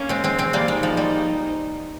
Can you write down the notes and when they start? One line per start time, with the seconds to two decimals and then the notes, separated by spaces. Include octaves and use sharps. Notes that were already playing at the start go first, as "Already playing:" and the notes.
Already playing: A#3 C#4
0.09 G#3 C4
0.24 G#3 C4
0.38 G#3 C4
0.53 G3 A#3
0.68 G#3 D#4
0.83 F3
0.97 G3